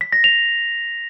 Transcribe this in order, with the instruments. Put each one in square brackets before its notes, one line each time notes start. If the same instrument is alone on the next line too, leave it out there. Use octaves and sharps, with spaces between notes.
[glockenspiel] B6
A#6
F7